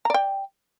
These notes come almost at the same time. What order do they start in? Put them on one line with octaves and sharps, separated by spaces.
A#5 D5 G5